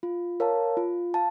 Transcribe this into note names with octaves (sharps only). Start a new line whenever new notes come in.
F4
A#4 C#5 F5 A5
F4
F5 A5